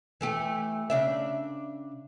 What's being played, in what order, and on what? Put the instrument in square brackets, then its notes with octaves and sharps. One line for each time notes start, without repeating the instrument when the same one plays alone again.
[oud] E3 A3 G4
C#3 D4 E5